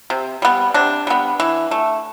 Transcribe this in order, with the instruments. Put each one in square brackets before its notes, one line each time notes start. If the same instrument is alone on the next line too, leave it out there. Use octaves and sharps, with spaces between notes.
[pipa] C3
G3 B3
C3 D4
G3 B3
E3
A3